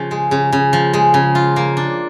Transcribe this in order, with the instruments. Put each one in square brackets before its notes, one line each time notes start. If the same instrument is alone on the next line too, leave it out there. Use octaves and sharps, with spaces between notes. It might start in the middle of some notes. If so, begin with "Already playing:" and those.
Already playing: [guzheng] C#3 F3
G#3
C#3
C#3
F3
G#3
C#3
F4
A#3
D4